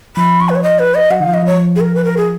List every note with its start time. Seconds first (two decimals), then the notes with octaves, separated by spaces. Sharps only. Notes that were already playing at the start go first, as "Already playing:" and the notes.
0.17 F3 B5
0.41 C#6
0.49 B4
0.56 C#5
0.63 D#5
0.79 B4
0.95 D#5
1.10 F#3 F#5
1.20 D#3
1.23 F3 F5
1.34 D#5
1.43 F3 C#5
1.76 G#4
1.81 A#4
1.95 B4
2.04 A#4
2.17 G#4